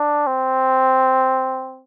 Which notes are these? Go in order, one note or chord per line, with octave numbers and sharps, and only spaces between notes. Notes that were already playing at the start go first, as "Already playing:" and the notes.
Already playing: D4
C4